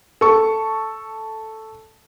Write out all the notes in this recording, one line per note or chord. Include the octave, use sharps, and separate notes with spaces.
A4 C#6